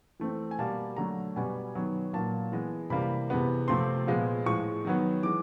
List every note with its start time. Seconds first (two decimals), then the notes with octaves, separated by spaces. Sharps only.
0.20 E3 A3 C4
0.51 G#5
0.58 B2 G3 A#3 A5
0.97 D3 F#3 A3 A#5
1.36 B2 G3 B3 G#5
1.75 D#3 F#3 B3
2.13 A#2 F#3 A#3 A5
2.52 E3 G#3 B3
2.90 C3 E3 G3 A#3 B5
3.30 C3 E3 G#3 B3
3.68 C3 F3 A3 C4 C6
4.07 A#2 F3 G#3 B3
4.45 A2 F3 G#3 C#6
4.85 D#3 F#3 B3
5.23 E3 G#3 D6